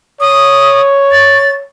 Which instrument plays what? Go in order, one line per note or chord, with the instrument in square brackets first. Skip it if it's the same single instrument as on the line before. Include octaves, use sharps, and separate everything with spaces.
[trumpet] C#5 [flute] D#6
[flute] A6